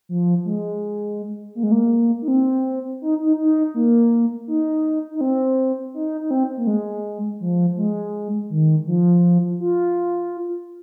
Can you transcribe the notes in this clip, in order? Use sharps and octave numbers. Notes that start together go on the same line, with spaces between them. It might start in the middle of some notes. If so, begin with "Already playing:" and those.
F3
G#3
A#3
G#3
A#3
D#4
C4
D#4
D#4
D#4
A#3
D#4
D#4
C4
D#4
D#4
C4
A#3
G#3
F3
G#3
D#3
F3
F4